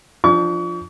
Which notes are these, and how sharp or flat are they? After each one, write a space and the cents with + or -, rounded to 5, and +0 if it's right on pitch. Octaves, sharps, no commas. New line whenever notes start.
F3 +0 D4 +25 C#6 +40